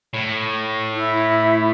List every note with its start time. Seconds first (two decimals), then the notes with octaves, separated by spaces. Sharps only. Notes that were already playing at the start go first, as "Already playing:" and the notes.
0.14 A2
0.93 E4